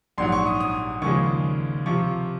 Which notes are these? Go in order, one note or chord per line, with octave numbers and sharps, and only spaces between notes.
A#1 G#2 F#3 C6
C#6
D#6
D#6
D#2 C#3 F3 G#3 C#6
C3 F3 C#6